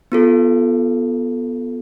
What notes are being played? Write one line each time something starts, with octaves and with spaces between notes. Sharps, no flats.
B3 F4 A4